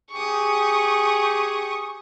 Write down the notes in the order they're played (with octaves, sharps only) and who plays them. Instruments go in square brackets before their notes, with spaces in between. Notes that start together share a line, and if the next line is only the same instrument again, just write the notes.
[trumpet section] G4 G#4 [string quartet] C#6 D#6